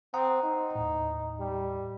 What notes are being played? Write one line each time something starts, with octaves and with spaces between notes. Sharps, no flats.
C4 F#5 A#5 D#6
D#4
D#2 A2
G3